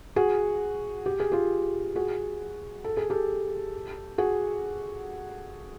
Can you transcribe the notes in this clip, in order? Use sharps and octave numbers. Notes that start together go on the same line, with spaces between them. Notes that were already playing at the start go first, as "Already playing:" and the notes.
F#4 G#4
G4
G#4
F4 G4
F#4 G#4
A4
G#4
G4 A4
F#4 G#4